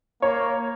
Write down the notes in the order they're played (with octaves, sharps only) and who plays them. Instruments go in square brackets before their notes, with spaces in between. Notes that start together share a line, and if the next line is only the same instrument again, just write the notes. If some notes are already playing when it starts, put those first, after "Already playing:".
[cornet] A#3 [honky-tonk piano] C#5